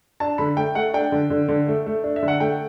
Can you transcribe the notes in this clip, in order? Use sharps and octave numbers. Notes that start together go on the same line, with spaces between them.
D4 A5
D3 B5
A3 G5
A3 F#5
D4 G5
D3
D3
D3
A3
A3
D4
E5
D3
F#5
A3 G5